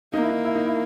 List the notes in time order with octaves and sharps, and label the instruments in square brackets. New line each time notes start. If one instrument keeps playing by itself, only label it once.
[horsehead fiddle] A#3 [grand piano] D#4
[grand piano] E4
D#4
E4
D#4
E4